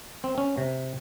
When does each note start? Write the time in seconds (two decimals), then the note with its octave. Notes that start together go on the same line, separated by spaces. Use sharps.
0.24 C4
0.38 C#4
0.58 C3